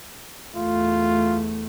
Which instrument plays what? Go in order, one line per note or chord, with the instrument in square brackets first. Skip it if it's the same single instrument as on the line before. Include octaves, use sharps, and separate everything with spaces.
[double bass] E2 A3 [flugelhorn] F4